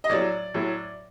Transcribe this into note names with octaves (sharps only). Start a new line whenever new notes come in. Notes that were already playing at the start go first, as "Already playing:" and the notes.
D#5
A2 F#3 D5
A2 F#3